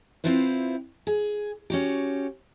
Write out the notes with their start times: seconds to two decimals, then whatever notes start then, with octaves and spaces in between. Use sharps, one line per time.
0.24 C4 C#4 E4 F4 B4 C5
1.07 G#4
1.70 C#4 F#4 G4